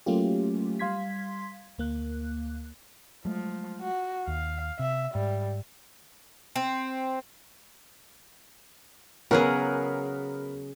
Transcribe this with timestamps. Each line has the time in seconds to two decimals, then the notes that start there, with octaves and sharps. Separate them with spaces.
0.06 F#3 A3 A#3 C#4 F4 G4
0.79 G3 F5 C6 G#6 B6
1.78 D2 A#3 F#6
3.25 F3 F#3 G#3 A3
3.81 F#4
4.28 D#2 F5
4.79 C3 E5
5.15 G#2 G3
6.56 C4
9.31 C#3 F#3 B3 G#4 A#4 F#5